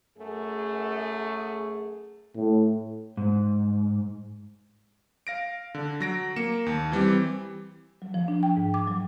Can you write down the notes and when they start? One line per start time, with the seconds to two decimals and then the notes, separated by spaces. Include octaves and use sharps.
0.18 F#2 A3 G#4
2.36 A2
3.17 G#2
5.27 F5 A#6 D7
5.74 D3
6.00 F#3 A#6 D7
6.36 A#3 C#7 E7
6.66 D#2
6.92 E3 G3 C4 G4
8.02 F#3
8.14 F3
8.28 D4
8.43 G5
8.57 G#2
8.74 D6
8.87 F#3